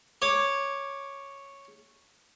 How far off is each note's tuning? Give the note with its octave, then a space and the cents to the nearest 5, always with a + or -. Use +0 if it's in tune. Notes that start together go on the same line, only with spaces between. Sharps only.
C#5 -5 D6 +0